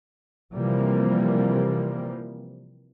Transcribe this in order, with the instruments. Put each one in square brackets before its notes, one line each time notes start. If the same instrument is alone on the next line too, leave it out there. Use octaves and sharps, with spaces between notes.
[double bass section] C3 E3 F3 G3 A#3